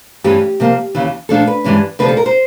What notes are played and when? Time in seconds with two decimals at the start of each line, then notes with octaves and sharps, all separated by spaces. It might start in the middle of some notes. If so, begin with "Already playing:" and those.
0.24 G2 E3 A3 C#4 G4
0.60 C3 F3 A#3
0.95 D#2 C#3 E3
1.29 A#2 F3 A3 D4 A4
1.47 B4
1.64 G2 E3 G#3 C#4
1.99 D2 C3 F3 B4
2.08 A4
2.17 A#4
2.26 C5